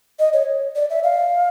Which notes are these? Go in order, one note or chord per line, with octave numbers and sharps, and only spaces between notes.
D#5
C#5
D5
E5
F5